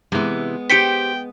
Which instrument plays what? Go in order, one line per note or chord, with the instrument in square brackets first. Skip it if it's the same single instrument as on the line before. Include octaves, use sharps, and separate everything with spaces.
[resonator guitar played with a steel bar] C3 E3 [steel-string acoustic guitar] G#3 B3
[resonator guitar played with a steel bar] G4 C5 [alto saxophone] G5 [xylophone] B6 C#7 D7